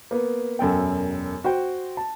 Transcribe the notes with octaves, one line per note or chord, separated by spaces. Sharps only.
A#3 B3
E1 F#2 A4 G5
F#4 C5 G5
A5